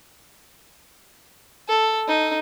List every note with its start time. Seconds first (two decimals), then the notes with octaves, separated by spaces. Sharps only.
1.69 A4
2.08 D#4